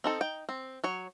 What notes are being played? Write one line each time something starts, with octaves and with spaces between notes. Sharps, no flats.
C4 D#4 A4
D#4 G5
C4
F#3 C#5